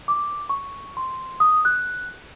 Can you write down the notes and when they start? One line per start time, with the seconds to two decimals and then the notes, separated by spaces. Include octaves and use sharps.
0.08 D6
0.49 C#6
0.97 C6
1.40 D#6
1.65 F#6